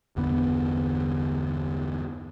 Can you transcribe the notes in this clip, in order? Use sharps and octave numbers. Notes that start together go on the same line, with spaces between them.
G1 E2 D3 B3